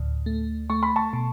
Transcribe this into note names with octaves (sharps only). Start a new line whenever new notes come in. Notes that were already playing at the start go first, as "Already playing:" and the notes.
Already playing: D2 A2
A3
A3 C#6
B5
A5 C#6
B2